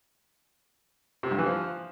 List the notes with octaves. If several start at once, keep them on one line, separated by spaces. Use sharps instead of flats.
C3
G2
E3
F3